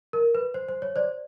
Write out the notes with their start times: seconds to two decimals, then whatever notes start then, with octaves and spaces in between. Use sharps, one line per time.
0.13 A#4
0.35 B4
0.54 C5
0.69 C5
0.82 C#5
0.96 C5 D5